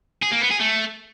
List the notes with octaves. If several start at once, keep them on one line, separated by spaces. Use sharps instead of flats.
G#4
A#3
B3
G#4
A3